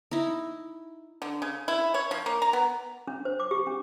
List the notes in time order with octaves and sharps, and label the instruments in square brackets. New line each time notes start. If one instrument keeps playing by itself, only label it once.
[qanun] D#4 E4
[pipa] D3
C#3
E4
C#5
F3
A#3
A#5
B3
[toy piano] D4
C5
D6
G4
D4